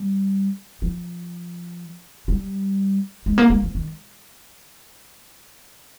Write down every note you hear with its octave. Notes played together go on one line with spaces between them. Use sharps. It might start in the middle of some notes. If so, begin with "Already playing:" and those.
Already playing: G3
F3
G3
G#3
A#3
G#3
F3
D#3